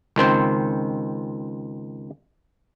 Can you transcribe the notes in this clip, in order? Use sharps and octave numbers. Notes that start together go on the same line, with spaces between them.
C#2 D#3 C4 C5